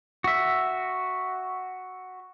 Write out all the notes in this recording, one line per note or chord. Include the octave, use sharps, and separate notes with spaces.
F#4 E5